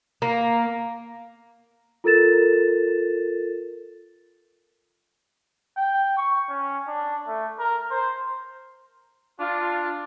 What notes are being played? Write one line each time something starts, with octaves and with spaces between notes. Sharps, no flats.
A#3
F4 A4 A#4 A6 E7
G5
C#6
C#4
D4
A3
A#4
C5
D4 F4